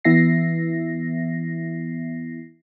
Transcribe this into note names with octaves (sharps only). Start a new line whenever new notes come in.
E3 B3 E4 E5 A#6 C7